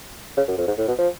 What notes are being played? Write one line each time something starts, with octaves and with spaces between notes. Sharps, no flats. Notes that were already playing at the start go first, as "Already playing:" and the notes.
C#3
F#2
F2
G#2
A2
B2
F3